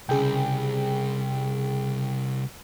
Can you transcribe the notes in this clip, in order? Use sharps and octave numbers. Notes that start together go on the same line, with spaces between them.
C2 C#3 G#4 G5